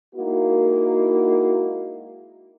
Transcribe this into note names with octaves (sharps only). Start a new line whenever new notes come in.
G#3 A#3 D#4 E4 F#4